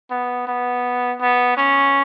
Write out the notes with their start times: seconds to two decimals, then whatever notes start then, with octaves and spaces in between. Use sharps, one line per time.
0.11 B3
0.47 B3
1.21 B3
1.57 C#4